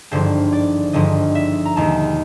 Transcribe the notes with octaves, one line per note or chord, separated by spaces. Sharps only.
G#1 G2 D3 F3 C5
D5
G#1 G2 D3 F3 D#5
E5
A#5
E1 D#2 D#3 G#3 A5